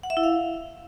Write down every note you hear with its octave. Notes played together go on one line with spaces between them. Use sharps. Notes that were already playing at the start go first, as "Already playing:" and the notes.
F#5
E5
E4
F5